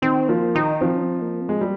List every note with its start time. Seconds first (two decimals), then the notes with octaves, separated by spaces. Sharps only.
0.02 D#3 C4
0.28 F3 A#3
0.55 D#3 D#4
0.81 F3 C4
0.97 C#4
1.02 C4
1.22 A#3
1.41 C4
1.49 G#3
1.60 G3 A#3